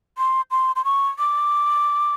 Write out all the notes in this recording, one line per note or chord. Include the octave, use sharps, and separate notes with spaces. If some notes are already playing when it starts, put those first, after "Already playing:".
C6
C6
C6
C#6
D6